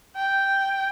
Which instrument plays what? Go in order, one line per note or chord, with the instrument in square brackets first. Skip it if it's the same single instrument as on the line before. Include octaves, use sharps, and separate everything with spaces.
[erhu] G5